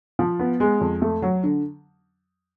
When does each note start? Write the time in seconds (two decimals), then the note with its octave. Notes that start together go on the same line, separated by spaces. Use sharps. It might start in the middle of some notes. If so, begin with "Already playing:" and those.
0.19 F3
0.39 B3
0.60 G#3
0.81 F2
1.02 A3
1.22 F#3
1.43 D3